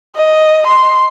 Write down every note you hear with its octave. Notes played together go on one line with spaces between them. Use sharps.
D#5
C6